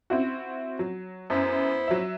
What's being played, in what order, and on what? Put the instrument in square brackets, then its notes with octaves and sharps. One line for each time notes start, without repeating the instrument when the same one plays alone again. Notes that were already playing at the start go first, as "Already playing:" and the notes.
[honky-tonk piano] C4 E4 F#4
F#3
[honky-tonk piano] F#2 [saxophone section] B3 E4 C5
[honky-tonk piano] F#3 E5